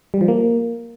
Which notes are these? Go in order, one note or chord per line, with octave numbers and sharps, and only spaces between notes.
G3
F3
A#3